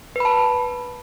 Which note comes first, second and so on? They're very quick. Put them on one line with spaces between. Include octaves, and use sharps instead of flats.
B4 B5 A5